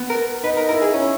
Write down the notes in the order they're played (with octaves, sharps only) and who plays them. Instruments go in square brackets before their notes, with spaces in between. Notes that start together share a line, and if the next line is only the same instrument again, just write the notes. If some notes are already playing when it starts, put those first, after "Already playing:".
Already playing: [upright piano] B3
[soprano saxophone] A#4
[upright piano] D#4 [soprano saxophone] B4
[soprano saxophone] A#4
[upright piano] E4 [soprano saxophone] A#4
[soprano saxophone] G#4
[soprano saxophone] C#4 [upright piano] E4